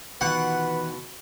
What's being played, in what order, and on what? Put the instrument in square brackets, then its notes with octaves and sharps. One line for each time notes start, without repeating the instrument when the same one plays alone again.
[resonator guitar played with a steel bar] B2 [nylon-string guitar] D#3 E3 F4 [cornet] B4 [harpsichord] F#5